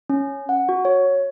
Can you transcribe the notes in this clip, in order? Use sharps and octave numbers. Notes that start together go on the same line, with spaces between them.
C#4
F#5
F#4
C#5